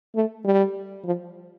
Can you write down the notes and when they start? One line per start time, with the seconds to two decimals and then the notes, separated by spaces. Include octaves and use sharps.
0.15 A3
0.45 G3
1.04 F3